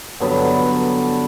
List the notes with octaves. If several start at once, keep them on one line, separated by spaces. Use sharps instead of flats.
G2 D3 F#3 B3